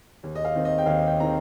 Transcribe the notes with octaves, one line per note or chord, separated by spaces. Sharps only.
D#2
D#5
F5
D#3 C4
D#5
G5
D#2 F5
G5
D#3 C4 A#5